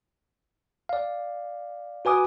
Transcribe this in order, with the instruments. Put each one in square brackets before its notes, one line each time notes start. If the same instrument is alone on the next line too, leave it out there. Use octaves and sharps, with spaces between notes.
[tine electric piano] D5 F5
F#4 B4 G#5 D6 D#6